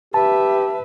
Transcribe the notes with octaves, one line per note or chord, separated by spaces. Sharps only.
G4 B4 E5 A5